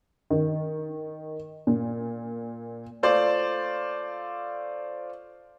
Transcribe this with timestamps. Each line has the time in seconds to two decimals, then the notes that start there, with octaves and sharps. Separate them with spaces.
0.30 D#3
1.67 A#2
3.03 A3 F4 C5 D5